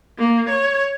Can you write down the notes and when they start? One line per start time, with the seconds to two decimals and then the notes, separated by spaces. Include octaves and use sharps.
0.19 A#3
0.49 C#5